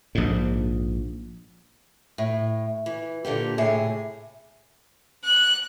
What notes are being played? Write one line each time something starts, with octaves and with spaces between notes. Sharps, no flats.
A#1 G#2
A2
E3
A#2 D3 A#3 G4
A2 C3 G#4
F#6